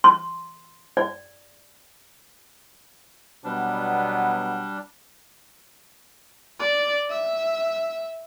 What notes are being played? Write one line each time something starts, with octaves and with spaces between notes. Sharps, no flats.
C6
D5
B2 F#3 G3 B3 D4
D5
E5